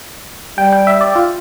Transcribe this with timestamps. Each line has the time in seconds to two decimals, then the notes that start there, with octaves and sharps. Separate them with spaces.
0.58 G3 G5
0.73 G5
0.87 E5
1.01 D5
1.15 F4